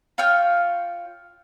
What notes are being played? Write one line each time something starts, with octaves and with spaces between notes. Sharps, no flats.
F4 C#5 G5 F6